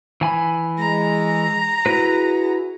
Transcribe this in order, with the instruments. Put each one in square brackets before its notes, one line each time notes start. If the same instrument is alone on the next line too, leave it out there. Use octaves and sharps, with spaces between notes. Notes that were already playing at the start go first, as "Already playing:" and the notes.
[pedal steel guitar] E3 G#5 B5
[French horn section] G#3 [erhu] A#5
[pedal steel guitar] E4 B4 [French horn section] F#4 G#4